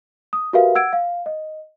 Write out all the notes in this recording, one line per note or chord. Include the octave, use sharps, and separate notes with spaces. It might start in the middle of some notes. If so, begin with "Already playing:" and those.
D#6
F#4 G4 A#4 B4 E5 F5
F#5 E6 G#6 D7
F5
D#5